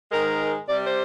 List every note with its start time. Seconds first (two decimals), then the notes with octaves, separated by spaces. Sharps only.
0.11 G#2 D#3 G#3 A#4
0.68 C3 G3 D5
0.84 C5